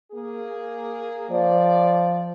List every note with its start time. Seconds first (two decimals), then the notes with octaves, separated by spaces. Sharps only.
0.12 A#3 G#4
1.31 F3 D5